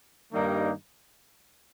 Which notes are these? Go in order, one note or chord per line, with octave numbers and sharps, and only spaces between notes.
G2 D#3 G3 A#3 D#4